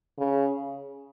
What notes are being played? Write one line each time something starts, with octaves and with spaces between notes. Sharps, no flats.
C#3